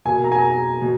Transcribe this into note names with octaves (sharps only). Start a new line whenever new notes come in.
B2 A#3 G#5
A#5
G#5
A#5
B2